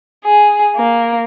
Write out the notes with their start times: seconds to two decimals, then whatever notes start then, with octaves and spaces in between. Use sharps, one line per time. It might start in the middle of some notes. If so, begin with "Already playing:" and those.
0.25 G#4
0.76 A#3